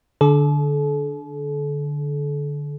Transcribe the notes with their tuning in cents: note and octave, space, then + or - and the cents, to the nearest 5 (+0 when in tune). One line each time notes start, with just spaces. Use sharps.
D3 +0 A4 -40